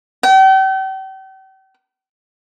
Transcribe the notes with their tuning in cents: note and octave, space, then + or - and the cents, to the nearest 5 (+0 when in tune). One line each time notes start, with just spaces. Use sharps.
G5 -40